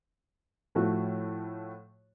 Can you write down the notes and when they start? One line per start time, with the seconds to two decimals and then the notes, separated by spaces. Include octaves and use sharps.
0.75 A2 F3 A3 F#4